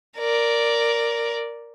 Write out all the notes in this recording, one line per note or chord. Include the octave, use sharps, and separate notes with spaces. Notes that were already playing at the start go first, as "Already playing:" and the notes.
A#4 D5